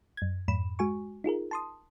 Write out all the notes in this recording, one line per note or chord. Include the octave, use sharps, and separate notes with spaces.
F#2 G#6
F2 G#2 B5 E7
G#3 F#4 G#5 C#6
D#4 F4 G#4 A#4
A5 C6 D#6